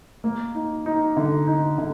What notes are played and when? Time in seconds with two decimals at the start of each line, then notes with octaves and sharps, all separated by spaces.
0.24 A#3
0.55 D#4
0.86 D#4
1.17 D3
1.47 D#4
1.78 D3